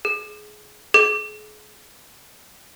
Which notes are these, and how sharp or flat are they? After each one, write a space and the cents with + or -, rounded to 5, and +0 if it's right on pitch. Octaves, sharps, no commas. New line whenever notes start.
G#4 +20
G#4 +40